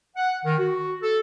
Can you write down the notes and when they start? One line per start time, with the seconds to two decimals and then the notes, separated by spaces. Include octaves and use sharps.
0.17 F#5
0.45 D#3
0.59 F#4
1.03 A4